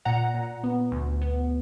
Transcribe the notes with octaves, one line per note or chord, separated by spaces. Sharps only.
A#2 F#5 A#5
A#2
B3
D2
B3